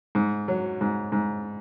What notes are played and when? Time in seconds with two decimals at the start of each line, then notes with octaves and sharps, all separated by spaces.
0.15 G#2
0.48 F#3
0.81 G#2
1.12 G#2